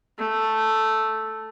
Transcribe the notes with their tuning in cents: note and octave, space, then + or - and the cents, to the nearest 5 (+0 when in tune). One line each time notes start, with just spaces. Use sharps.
A3 +0